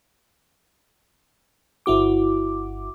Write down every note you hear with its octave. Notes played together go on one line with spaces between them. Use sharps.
G1 E4 F#4 D6